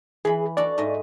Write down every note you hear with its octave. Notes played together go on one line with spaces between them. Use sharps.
E3 G#4 B5
D4 F#4 A4 D5
G#2 A3 D#5